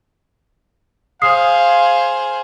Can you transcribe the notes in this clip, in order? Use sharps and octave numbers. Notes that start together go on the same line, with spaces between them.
G#4 C5 F5 D#6 C7